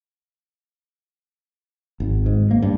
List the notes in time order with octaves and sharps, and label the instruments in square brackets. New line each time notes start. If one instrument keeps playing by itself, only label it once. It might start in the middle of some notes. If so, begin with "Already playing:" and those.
[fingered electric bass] G#1
G#2
A#3
G2